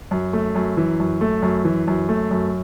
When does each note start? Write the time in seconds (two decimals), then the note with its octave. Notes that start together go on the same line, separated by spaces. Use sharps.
0.11 F#2
0.33 A3
0.55 F#2
0.77 E3
1.00 F#2
1.21 A3
1.42 F#2
1.65 E3
1.87 F#2
2.09 A3
2.31 F#2